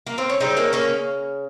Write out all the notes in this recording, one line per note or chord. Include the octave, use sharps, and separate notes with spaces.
A#3
C4
C#4
C#3 G3 C4 D#4
A#3 C#4
A#3 C#4